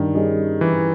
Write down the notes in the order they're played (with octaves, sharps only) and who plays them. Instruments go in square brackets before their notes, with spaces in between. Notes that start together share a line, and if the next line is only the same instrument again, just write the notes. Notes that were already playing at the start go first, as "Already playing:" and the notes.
Already playing: [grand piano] G2 [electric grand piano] D#3
[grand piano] G3 C#4 G#4 D#5
[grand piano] G2 [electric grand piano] E3